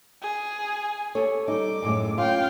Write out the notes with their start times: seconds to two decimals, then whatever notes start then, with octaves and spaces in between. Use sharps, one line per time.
0.22 G#4
1.15 G4 A4 C#5
1.48 G3 D#4 D6
1.83 F#2 A2 G#3
2.18 C#4 F4 F5 G5